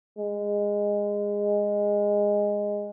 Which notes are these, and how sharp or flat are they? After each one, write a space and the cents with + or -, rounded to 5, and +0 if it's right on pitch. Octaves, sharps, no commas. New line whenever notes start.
G#3 -15